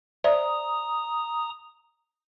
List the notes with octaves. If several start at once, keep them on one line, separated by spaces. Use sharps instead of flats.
C5 D5 E5 A#5 D#6